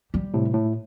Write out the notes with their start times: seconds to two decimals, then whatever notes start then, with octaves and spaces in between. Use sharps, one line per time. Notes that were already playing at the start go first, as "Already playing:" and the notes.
0.14 G3
0.34 A2 C3
0.54 A2